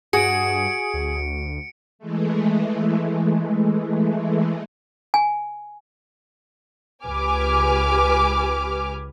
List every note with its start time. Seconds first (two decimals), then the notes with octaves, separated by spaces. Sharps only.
0.13 G2 F#4 G#4 C#7 D7
0.94 D2
1.99 E3 G#3 A3
5.14 G#5
7.05 C#2 G4 B4 G#5 D6 F6